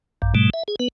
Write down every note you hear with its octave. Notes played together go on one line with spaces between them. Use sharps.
A#1 G2
G#2 B2 G3 A3
E5
G#4
B3 B4